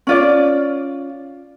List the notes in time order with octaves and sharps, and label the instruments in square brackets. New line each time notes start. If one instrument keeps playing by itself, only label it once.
[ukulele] C#4 F4 D5